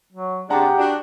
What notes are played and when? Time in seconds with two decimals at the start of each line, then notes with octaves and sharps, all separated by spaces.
0.12 F#3
0.50 C3 G#3 D4 G4 G#4 F#5 A#5
0.78 D4 F#4